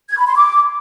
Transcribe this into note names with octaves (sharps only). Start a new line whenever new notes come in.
G#6
B5
C6
D6